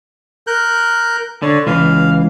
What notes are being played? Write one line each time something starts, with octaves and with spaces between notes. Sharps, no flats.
A#4 F#6 G6
D3 C#5 D5
C#2 E3 F5